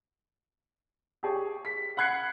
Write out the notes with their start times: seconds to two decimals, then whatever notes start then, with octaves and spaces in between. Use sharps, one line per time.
1.23 G4 G#4 C#5
1.65 B6
1.97 F#5 B5 F#6 G#6 C7 C#7